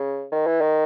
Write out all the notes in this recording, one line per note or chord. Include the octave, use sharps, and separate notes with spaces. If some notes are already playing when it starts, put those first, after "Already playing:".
Already playing: C#3
D#3
E3
D#3